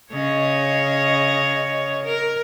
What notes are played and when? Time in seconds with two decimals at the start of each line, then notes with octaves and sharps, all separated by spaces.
0.12 C#3 C#5 D#5
2.04 A#4